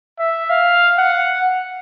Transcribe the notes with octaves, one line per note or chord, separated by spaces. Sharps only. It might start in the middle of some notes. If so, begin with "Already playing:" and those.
E5
F5
F#5